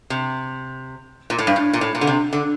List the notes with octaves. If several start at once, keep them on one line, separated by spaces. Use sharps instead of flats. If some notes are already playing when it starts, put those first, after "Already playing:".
C3
A#2
A2
G2
A2
A#2
A2
A#2
D3
C3
D3